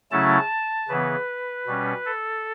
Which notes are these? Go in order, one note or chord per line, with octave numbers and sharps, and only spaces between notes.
C#3 F#3 A3 C#4 E4 A5
C#3 E3 B3 B4
B2 G3 C#4
A4